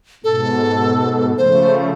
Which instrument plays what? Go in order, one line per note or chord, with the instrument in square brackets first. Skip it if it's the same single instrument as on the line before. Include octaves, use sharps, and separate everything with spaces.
[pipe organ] G#2 B2 [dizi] A4
[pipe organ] C#3 F3 A3 [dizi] C5